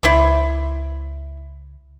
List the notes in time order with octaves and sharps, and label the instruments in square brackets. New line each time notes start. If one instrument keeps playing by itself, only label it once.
[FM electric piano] C#2 [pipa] E4 C5 D5